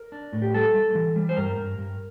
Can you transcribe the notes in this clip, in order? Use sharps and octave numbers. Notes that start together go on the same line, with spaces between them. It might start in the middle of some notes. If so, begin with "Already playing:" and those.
Already playing: A#4
D4
A2
G4
G3 A4
G3
E3
G3
C5
G2 A#4
G2
G2